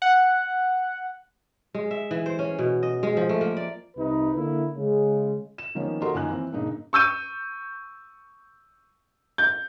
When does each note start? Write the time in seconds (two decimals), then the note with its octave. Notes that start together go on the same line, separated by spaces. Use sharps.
0.02 F#5
1.74 G#3
1.91 E5
2.11 E3
2.26 C5
2.39 C#4
2.59 B2
2.83 D#5
3.03 G#3
3.17 F3
3.29 A3
3.41 A#3
3.57 D5
3.97 C2 C3 D#4 B4
4.35 D3 A#3 E4
4.75 C#3 G#3
5.58 E7
5.75 D#3 F3 A#3 B3 C#4
6.02 F#4 G4 A4 A#4 D#5 C6
6.14 F#2 D#3 A#3 F4 G#5 F#6
6.28 E3 C4
6.52 G2 A#2 C#3 D#4
6.93 C#6 E6 G6 D#7
9.38 G6